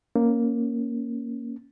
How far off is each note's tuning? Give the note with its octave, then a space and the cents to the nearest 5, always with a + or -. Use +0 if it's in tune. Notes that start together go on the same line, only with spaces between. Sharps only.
A#3 +0 C#4 +0